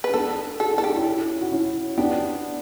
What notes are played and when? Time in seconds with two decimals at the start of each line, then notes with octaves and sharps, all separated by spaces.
0.04 B4
0.09 C#4
0.14 B3 D4 A4
0.60 F#4 A4
0.72 E4
0.78 A4
0.84 D4 G4
0.96 C#4 E4
1.41 F#4
1.52 C#4 E4
1.98 B3 D4 G4